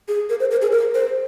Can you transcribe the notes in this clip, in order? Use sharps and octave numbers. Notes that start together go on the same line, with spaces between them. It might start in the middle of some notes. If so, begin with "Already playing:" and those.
G#4
A#4
C5
A#4
G#4
A#4
C5